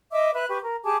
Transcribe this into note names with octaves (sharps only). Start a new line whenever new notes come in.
D#5 E5 D6 E6
B4 E5 F#6
G4 B4 C#6
A#4
G4 G#4 A5 D6